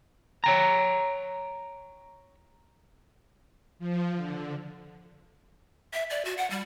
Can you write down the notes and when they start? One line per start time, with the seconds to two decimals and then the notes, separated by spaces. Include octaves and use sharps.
0.44 C#5 G5 A#5
3.79 F3
4.16 D3
5.93 E5
6.10 D5
6.25 F#4
6.38 F#5
6.50 G3